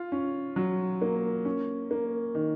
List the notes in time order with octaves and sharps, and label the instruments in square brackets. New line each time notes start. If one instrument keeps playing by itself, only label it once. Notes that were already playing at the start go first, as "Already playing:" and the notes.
Already playing: [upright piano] F4
C#4
F#3
A#3
C#4
A#3
D#3